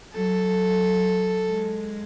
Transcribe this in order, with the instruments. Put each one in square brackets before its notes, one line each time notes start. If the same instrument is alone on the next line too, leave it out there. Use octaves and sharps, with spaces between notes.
[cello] F#3 [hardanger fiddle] A4
[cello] G#3